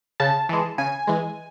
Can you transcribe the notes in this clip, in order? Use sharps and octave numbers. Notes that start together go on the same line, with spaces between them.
C#3 A5
E3 G#3
C#3 G#5
E3 G#3